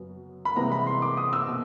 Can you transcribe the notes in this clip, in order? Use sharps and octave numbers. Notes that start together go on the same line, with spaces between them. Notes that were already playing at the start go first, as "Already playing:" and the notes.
Already playing: F#2 C#3 F#3 B3
B5
C2 C3 E3 G#3 B3 A#5
B5
C6
D6
D#6
E6
B2